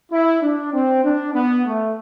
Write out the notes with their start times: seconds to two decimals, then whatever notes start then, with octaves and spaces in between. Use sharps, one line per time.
0.12 E4
0.42 D4
0.73 C4
1.04 D4
1.34 B3
1.65 A3